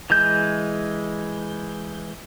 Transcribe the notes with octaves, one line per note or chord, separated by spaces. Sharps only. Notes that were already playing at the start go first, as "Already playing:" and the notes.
E3 G#3 G6